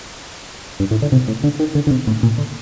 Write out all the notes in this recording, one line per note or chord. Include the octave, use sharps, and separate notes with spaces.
G2
A2
D3
C3
A2
D3
D#3
D3
D3
C3
A2
A#2
D3